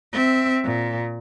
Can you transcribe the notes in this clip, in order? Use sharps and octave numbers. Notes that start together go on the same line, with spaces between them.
C4 E5
A#2